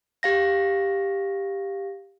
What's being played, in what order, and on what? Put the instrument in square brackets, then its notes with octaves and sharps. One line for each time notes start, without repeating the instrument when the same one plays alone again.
[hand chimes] G4 F5 A#6